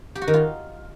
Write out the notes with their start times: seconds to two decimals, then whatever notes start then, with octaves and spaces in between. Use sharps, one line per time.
0.15 G4
0.22 F#4
0.28 D#3
0.34 F4